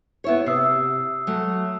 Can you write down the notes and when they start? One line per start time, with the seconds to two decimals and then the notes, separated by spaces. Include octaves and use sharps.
0.24 B3 E4 C#5
0.46 C3 D#6 E6 C7
1.27 F#3 A3